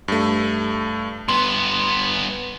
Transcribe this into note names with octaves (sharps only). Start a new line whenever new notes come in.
G2 A3
G2 B3 C6